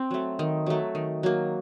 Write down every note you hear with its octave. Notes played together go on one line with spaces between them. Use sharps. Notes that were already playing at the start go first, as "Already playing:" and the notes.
Already playing: C4
F#3 A3
D#3
F#3 A3
D#3
F#3 A#3